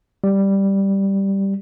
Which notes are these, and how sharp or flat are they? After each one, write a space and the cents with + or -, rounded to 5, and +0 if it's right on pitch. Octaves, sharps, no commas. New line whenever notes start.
G3 +0